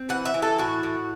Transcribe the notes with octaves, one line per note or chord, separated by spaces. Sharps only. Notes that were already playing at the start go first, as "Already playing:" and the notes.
Already playing: C4
E3 F#5
E5
E3
A4
A2 F#4
A2